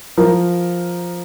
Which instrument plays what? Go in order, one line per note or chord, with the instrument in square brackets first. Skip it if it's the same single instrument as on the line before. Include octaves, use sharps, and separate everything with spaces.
[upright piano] F3 A#4